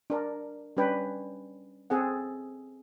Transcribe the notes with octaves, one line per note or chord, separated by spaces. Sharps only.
D4 A#4
G3 C#4 D4 B4 G5
C4 G#4 A4 F#5